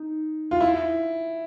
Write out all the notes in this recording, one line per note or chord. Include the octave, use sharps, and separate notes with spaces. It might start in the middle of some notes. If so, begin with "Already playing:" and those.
Already playing: D#4
F4
E4